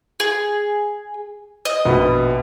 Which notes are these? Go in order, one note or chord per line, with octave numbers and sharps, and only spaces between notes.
G#4
D#5
A#1 B2 B5